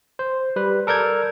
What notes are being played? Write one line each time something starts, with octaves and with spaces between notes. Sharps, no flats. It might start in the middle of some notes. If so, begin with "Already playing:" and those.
C5
G3 B4
A4 A#4 D5 G6 G#6